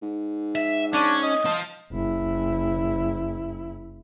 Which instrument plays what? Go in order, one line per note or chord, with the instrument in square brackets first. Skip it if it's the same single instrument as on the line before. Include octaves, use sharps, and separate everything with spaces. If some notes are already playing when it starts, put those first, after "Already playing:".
[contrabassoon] G#2
[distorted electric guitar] E5
[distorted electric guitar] C#4 [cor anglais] D4
[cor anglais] D#5
[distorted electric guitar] F4 A5
[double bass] F#1 E4